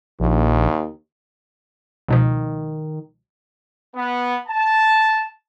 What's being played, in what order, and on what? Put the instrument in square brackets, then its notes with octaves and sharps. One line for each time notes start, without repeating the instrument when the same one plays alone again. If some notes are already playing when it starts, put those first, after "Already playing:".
[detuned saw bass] A#1 [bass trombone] D#2
[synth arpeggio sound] C#2 B2 F3 [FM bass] D#3
[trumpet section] B3
A5